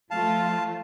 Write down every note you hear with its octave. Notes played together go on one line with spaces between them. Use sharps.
F3 A3 F4 F5 A5